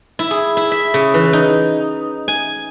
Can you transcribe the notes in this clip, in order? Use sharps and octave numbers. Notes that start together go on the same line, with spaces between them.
E4
G#4
E4
E5
C#3
E3
D#4
G#5